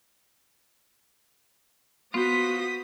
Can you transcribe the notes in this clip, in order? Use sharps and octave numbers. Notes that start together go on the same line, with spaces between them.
B3 F4 F#4 C5 D#6 B6